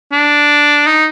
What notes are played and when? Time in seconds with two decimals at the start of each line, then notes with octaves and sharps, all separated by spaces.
0.12 D4
0.86 D#4